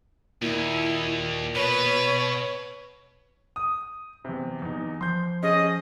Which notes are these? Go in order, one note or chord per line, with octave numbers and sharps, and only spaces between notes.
D#2 A#2 E4
B2 B4 C#5
D#6
E2 C3
E2 D#4
F3 C6 G6
C#4 G#4 D#5